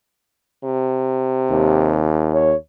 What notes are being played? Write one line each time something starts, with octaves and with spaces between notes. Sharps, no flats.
C3
D#2
C#5